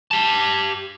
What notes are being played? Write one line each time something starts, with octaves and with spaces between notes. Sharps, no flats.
G4 A5